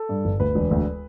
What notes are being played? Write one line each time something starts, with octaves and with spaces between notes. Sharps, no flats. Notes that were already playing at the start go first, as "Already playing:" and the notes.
Already playing: A4
G2
G1
D2 B4
E1
D2